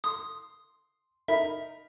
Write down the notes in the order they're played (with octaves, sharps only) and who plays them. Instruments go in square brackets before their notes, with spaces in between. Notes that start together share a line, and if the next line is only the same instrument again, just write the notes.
[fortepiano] C6 [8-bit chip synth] D#6
[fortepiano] D#4 A#4 B5 [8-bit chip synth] E5